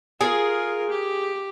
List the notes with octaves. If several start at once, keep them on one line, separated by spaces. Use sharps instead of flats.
F4 G#4 A#4
G4